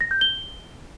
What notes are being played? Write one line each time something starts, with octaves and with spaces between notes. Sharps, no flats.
A#6
G6
G7